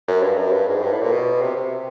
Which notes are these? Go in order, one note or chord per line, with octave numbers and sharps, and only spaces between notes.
F#2
G2
F#2
G2
G#2
G2
A2
A#2
B2
C3
C3